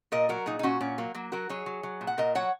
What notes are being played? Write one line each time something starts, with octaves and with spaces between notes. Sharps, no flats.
A#2 A#4 D#5
F#3 F#4 A#4
A#2 D#4 G#4
D#4
A#2 C#4 F#4
A#2 C#4
F#3 A#3
F#3 A#3
F#3 F#4 A#4
F#3 G#4 C#5
F#3
F#3
A#2
F#5
A#2 A#4 D#5
F#3 C#5 F#5